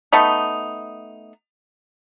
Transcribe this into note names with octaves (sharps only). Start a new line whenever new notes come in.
A3 B3 D#4